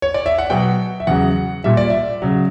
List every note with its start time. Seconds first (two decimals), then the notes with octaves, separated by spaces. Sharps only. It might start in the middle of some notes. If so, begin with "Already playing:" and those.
0.02 C#5
0.14 D5
0.26 E5
0.38 F#5
0.50 B2 F#3 G5
1.00 E5
1.07 E2 C#3 F#3 F#5
1.64 A#2 G3 E5
1.77 D5
1.90 E5
2.22 C#3 F#3